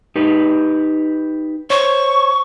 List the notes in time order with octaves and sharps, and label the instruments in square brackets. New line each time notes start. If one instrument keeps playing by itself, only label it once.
[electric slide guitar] D#4 G4 B4
[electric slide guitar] C5 C#5 [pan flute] C#6